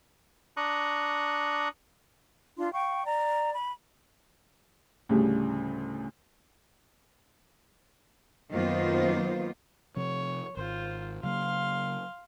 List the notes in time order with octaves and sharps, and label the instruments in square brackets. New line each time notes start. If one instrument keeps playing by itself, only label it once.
[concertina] D4 A#5 C#6 D#6 F#6
[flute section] D4 F4 C6
F5 G5 C#6
D5 A#5
B5
[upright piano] D2 A2 C#3 G3
[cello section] F#2 D#3 A#3 B3 F4 C5
[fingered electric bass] C3 F3 [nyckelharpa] C#5
[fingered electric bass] G#1 [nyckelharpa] F4 C5
[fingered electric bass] C#3 F#3 A#3 [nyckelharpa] F5 C6